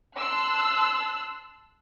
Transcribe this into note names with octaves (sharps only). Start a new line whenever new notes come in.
A5 C6 E6 F#6